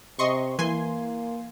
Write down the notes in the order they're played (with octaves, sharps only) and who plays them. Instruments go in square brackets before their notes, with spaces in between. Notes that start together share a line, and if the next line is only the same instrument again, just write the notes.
[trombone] C3 [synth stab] D#5 C6 C#6
[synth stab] E3 G#5 C6 [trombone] A#3